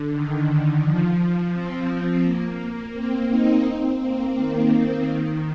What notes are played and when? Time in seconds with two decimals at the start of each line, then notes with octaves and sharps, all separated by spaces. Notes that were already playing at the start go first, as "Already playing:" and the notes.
Already playing: D3
0.11 D#3
0.82 F3
1.53 C4
1.88 C4
2.23 A#3
2.94 C4
3.29 D#4
3.64 C4
4.00 A#3
4.36 D#3
5.07 D#3